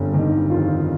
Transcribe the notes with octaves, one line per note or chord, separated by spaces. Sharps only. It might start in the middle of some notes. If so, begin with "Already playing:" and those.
Already playing: G1 F2 G3
D#3
F2 F4